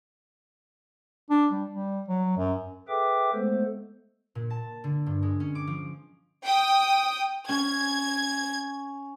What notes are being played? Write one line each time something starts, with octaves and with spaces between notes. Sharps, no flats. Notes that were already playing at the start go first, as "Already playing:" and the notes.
D4
G3
G3
F#3
F#2
G#4 A4 B4 E5 G5 D6
G#3 A3 B3 A4 C5
A#2
A5
D3
G2
G#3
C#4
D6
F3
G5 D#6
C#4 G#6